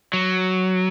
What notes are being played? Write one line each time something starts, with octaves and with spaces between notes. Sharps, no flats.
F#3